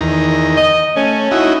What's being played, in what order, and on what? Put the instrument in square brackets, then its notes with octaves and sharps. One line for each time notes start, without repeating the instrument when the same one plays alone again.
[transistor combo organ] E2 D#3 A#5
[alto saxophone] D#5
[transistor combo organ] A3 [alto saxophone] C#4
[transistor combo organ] D#4 E4 F#4